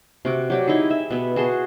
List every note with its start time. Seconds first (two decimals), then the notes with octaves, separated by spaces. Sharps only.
0.25 C3 F#4 D6
0.50 F#3 G4 D5
0.68 D#4 E4 G4 G#4
0.90 E5
1.10 B2 B3
1.36 F#4 G#4 A5 C6